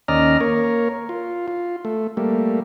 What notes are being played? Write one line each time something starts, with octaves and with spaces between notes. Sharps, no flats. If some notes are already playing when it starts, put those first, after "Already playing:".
D#2 C#4 D5 D#5 A#5 F6
A#3 A#4 C#5
F4
F4
A3
G3 A3 A#3